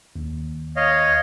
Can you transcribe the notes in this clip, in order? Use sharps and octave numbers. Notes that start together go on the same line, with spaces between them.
D#2
C#5 D#5 F5